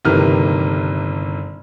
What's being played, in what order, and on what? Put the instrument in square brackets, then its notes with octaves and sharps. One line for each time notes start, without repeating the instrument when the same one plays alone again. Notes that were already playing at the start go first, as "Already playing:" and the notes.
[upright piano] G1 C3 D#3 E3 A#3 F6